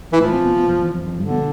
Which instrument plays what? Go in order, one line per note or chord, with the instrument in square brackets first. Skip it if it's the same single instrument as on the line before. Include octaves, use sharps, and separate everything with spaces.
[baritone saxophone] E3
[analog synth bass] A2 [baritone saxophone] F3
[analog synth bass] C3
B2
B2
F2
E2
F2
F2
[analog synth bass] G2 [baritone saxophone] D3
[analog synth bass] B2